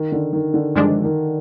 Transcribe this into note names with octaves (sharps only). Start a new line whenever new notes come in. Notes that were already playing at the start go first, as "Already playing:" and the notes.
Already playing: D#3
D3
D#3
D3
G2 D#3 F3 G#3 D4
D#3